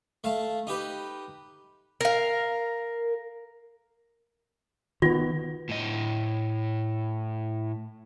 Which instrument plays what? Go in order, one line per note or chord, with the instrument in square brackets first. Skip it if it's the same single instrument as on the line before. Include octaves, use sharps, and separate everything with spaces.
[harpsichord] A3 F5 A5
D#4 G4 B4
[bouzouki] A#4 F5
[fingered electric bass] D#3 B3 [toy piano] F4
[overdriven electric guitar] A2 D#5